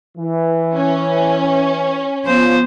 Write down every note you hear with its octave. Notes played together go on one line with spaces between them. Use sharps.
E3
C#4
F3 B3 C5